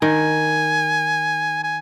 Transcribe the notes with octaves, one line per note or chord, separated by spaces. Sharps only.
D#3 G#5
G#5